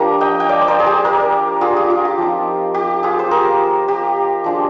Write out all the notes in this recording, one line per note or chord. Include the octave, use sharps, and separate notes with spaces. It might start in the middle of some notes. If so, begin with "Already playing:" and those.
Already playing: F3 A#3 D4 G4 A#4
D#5 G5
G5
D5 F5
C5
A#4 D5
G#4
G4
G4 A#4
F4 G#4
G4
F4
G4
F3 C4 D#4
G4
F4 G#4
C5
G4 A#4
G4
F3 G#3 D4 F4